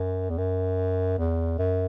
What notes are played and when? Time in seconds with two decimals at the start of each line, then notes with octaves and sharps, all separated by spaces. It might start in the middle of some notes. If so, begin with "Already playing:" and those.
Already playing: F#2
0.30 E2
0.38 F#2
1.18 E2
1.58 F#2